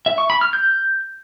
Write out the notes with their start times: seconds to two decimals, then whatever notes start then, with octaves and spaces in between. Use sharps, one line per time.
0.06 E5
0.18 C#6
0.30 B5
0.41 F6
0.53 G6